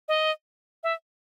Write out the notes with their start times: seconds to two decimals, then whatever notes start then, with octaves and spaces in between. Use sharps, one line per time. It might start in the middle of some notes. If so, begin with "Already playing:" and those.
0.08 D#5
0.83 E5